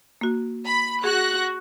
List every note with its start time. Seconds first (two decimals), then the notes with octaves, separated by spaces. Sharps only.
0.21 A#3 F#4
0.66 B5
1.04 F#4 G#4 F#6 A#6